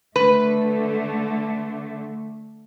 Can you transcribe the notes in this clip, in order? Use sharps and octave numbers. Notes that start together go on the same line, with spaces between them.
D3 A3 B4